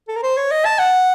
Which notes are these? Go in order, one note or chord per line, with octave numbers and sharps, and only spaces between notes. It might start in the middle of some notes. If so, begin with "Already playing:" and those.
A4
A#4
C5
C#5
D#5
A5
F#5